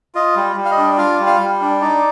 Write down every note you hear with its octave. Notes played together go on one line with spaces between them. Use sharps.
F4 D#5
G3
G3
F5
D#5
D4
F4 F5
G3
F5
G3
D4
D#4 D5